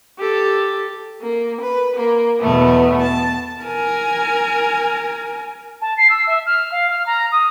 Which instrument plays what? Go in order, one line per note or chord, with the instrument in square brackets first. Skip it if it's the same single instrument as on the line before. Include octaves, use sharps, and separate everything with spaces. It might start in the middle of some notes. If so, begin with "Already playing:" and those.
[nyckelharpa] G4 A4
[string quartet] A#3
B4
A#3
E2 B2 A3 B3
A5
[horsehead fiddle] A#4 G#5
[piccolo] A5
C7
E6
E5
F6
F5
F6
A#5
D#6